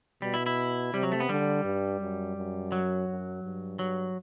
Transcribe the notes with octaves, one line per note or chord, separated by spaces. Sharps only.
B2 G3
E4
E4
C3 G3
F#3
A3
B3
D3 G3
G2
F#2
F#2
F#3
F#2
G2
F#3